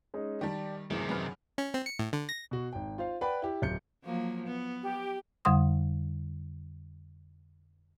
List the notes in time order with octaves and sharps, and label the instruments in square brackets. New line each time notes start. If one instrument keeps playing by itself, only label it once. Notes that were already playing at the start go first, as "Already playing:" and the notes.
[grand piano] G#3 C#4 D#4
[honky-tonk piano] D#3 G3 [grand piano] G4 D5 A5
[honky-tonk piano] A1 F#2 [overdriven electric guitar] C3 D#3 [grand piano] G#4
[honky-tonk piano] F#2 B4 F6
[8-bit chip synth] C#4
C4
C#7
A2
D3
A#6
[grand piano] B2 F#4
G#1 G5
F4 C5 F5
B4 D5 F#5 G5 B5
E4 G4
D1 G6 C#7
[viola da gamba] F3 F#3 A#3
B3
[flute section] G4
[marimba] F2 D3 G3 F#5 C6 D#6